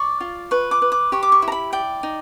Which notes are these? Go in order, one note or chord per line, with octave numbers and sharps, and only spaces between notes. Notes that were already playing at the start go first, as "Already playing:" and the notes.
Already playing: D5 C#6
F4
B4 C#6
D6
B4
D6
G4 C#6
D6
C#6
E4
A#5
B5
D5 G5
D#4